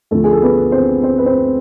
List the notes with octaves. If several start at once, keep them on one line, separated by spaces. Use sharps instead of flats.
D2 D3 F3 A3 A4
G#4
A4
B3 B4
C4 C5
C4 C5
B4
C4 C5